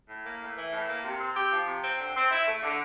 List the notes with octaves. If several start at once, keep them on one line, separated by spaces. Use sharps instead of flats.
A2
A#3
A2
E3
A2
A#3
C3
C4
G4
F3
C3
C4
D3
C4
E4
A3
D3